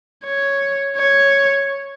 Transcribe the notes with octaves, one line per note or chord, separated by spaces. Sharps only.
C#5
C#5